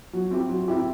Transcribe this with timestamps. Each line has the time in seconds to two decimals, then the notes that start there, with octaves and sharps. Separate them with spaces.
0.13 F#3
0.31 C4 E4 G4
0.50 F#3
0.68 C4 E4 G4